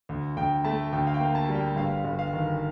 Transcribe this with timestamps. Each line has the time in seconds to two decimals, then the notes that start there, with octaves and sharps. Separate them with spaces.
0.09 D2
0.37 D2 G5
0.65 A3 A5
0.93 D2 G5
1.07 F5
1.14 G5
1.20 A#3
1.35 A5
1.49 G3
1.55 G5
1.77 G1 F5
2.04 G1
2.19 F5
2.33 D#3